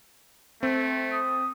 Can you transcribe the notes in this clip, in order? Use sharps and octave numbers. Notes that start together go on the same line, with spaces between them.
A3 C4
D#6